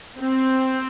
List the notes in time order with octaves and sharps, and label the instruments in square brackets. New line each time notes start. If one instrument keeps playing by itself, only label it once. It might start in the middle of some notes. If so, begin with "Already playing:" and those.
[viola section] C4